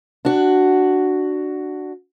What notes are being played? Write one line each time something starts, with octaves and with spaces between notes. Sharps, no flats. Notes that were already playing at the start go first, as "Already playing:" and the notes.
D4 F#4